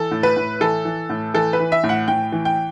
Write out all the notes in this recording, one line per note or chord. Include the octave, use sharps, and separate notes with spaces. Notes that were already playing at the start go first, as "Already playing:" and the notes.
Already playing: E3 A4
A2
B4
A2
E3 A4
E3
A2
E3 A4
B4
E3
E5
A2
F#5
A2 G5
E3
G5